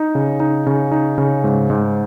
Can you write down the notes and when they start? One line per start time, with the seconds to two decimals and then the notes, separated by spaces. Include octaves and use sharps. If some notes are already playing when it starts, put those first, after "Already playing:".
Already playing: D#4
0.15 C#3
0.40 D#4
0.66 C#3
0.91 D#4
1.18 C#3
1.44 G#2
1.70 G#2